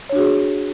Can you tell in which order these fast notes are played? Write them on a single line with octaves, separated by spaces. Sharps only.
C#5 D4 F#4 G#4